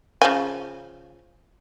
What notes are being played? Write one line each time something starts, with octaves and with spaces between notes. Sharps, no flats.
C#3 F3 G#5